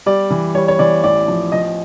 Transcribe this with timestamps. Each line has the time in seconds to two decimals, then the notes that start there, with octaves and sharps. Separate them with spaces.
0.06 G3 D5
0.31 E3
0.55 G3 C#5
0.68 C#5
0.79 E3 D5
1.04 A1 D5
1.28 F3
1.52 F3 D#5